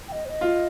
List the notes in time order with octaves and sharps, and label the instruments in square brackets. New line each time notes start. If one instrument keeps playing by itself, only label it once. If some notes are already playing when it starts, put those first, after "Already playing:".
[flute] G5
D#5
C5
D#5
[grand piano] F4